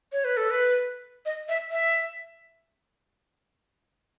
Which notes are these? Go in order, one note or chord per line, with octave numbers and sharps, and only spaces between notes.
C#5
B4
A4
B4
D#5
E5
E5